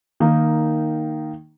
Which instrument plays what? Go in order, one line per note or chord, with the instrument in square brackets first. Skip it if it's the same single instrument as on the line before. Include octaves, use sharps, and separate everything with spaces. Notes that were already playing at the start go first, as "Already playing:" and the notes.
[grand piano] D#3 A#3 D#4